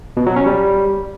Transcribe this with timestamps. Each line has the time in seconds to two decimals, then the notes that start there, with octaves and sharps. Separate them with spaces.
0.17 B2
0.27 F#3
0.36 C#4
0.46 G3